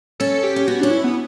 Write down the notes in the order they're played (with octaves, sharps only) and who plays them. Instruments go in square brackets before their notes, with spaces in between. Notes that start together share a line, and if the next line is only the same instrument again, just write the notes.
[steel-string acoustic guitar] C#4 [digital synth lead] A4
[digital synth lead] G4
[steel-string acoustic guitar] C#4
[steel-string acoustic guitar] B3 [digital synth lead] F#4
[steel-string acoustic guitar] C#4 [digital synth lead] D4
[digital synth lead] E4
B3